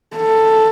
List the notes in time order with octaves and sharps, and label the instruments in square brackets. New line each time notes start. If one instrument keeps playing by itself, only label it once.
[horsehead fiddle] A4